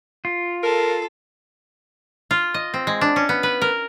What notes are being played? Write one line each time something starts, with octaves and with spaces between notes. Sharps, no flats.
F4
A4 A#4
F4
D#5
C4
G#3
D4
C#4
B3
B4
A#4